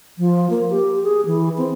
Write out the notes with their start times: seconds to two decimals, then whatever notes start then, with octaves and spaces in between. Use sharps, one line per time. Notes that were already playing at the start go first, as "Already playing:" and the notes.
0.18 F3
0.50 A#3
0.70 G4
1.04 G#4
1.26 E3
1.58 C4